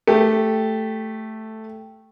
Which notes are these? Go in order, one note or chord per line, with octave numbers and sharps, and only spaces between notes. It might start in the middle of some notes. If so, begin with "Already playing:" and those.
A3 G4